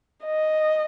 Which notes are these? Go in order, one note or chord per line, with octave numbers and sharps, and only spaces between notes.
D#5